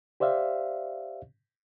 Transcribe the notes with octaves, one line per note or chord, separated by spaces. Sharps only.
G4 C5 D5 E5 F5